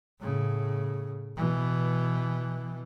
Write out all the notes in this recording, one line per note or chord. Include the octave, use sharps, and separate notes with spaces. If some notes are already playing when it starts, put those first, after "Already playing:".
A2 C#3
B2 E3